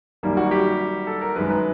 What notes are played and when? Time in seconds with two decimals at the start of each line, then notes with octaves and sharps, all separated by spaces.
0.23 F#2 D#3 G3 A#3
0.37 F#4
0.51 G4
1.07 A4
1.21 A#4
1.36 F#2 D#3 G#3 B4
1.50 B4